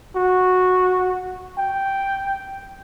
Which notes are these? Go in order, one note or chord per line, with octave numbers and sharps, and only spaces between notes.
F#4
G5